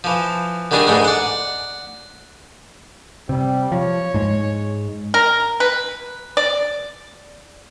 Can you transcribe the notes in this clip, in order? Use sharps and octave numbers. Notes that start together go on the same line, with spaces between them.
E3 F3
D3 D#3 G3 D4 G#4
G#2 E3 G#3 A3
D5 F#5
C3 G3
F3 C#5
G#2 G#3
A#4
B4
D5